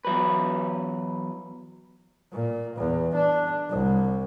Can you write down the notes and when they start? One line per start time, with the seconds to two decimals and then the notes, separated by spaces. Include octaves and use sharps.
0.05 E2 F#3 B4
2.32 A#2
2.77 E2
3.15 D4
3.70 C2